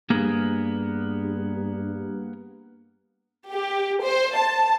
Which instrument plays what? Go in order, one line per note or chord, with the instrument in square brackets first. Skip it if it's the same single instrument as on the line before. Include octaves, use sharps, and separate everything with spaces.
[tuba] G2 [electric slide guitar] A#3 B3 G#4
[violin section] G4
C5
A5